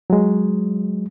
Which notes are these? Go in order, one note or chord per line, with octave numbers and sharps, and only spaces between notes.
F#3 G#3